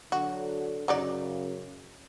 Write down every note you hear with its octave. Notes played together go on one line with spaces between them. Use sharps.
D3 F#3 F#4
F#2 C#3 F#3 D#4 D5